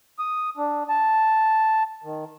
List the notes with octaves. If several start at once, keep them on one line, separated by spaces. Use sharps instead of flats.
D#6
D4
A5
D#3